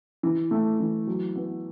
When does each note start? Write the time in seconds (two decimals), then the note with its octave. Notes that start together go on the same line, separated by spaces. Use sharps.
0.23 E3
0.51 A3
0.80 E3
1.07 F#3
1.35 B3